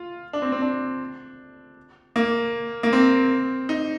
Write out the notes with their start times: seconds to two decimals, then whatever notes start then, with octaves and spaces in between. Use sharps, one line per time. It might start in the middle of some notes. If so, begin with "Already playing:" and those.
Already playing: F4
0.33 D4
0.42 C4
0.52 C4
0.62 D4
2.16 A#3
2.83 A#3
2.93 C4
3.69 D#4